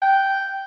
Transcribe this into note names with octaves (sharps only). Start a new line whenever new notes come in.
G5